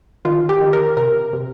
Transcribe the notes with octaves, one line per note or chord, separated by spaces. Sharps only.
D#3 F4
G4
D#3
A#4
C3 A#4
C3